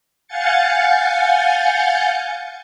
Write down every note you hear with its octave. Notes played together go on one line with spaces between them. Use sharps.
F5 F#5 G#5 G6 A6 C#7